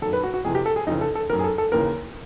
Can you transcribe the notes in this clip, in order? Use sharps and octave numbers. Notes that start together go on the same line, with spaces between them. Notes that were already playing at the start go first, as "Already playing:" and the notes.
F#2 D#3 A4
B4
F#4
F#4
F2 C3 E3 G#4
G4
A4
G#4
F2 C#3 E3 D#4
A4
A4
F#2 D#3 A#4
G#4
A4
A4
D#2 C#3 E3 A#4